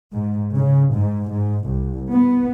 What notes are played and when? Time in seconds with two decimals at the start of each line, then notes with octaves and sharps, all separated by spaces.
0.15 G#2
0.54 C#3
0.95 G#2
1.31 G#2
1.69 C2
2.11 B3